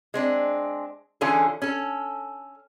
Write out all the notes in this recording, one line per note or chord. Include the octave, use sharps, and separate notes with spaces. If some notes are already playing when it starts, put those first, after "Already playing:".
G#3 C4 D4
D3 E3 C#4 F4 G#4 A4
C#4 A4